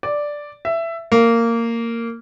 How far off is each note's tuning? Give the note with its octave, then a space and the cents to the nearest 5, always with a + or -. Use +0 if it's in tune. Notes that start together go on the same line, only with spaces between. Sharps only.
D5 +0
E5 +15
A#3 -15